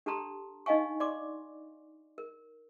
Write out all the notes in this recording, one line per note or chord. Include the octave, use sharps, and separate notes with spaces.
D4 G4 A4 A5 A#5 C6
D4 D#4 D#5 F5 G#5 C#6
D5 C6 D6
A#4